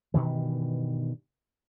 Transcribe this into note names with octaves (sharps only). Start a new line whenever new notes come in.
G2 B2 D#3 E3